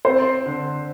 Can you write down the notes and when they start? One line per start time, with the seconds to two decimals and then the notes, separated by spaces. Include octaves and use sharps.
0.05 C4 C5
0.46 D3